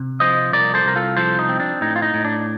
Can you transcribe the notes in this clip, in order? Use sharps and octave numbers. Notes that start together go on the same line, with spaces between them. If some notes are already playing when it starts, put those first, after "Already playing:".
Already playing: C3
F3 C5 D#5
C2 A#4 D5
A4 C5
C2 A#4
F4 A4
F3 A4 C5
D#4
C4
D4
A2 D#4
F4
D#4
A2
D4